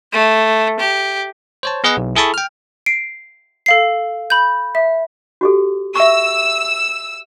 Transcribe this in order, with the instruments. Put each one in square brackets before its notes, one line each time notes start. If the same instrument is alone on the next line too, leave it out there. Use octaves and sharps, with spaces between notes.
[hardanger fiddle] A3
G4
[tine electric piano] C5 C#5 A5
B3 G#4 B4 D#5 F#5
B1
E4 G#4 A4 A5 B5 C#6
G5 F6
[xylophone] C7 D7
A4 F5 C7
B5 G6
E5
[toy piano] F#4 G4 A4
[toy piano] E5 C#6 [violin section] E6